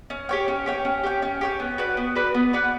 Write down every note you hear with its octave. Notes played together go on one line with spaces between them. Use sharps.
C#4
G4 C#5 G5
C#4
G4 C#5 G5
C#4
G4 C#5 G5
C#4
G4 C#5 G5
B3
F#4 B4 D5
B3
F#4 B4 D5
B3
F#4 B4 D5